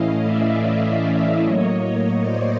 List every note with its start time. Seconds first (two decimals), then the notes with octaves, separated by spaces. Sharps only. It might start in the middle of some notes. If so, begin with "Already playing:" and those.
Already playing: A2 E3 A3 C#4 E4 D#5 F5
0.22 D5 E5
0.61 D5 E5
1.41 A2 F#3 A#3 C#5 D#5
2.21 C5 D5